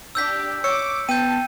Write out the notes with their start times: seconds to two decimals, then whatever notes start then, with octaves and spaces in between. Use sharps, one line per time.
0.15 D4 G4 E6 G6 B6
0.64 C#5 D6 E6 C#7
1.09 B3 G5 A5 G6 D#7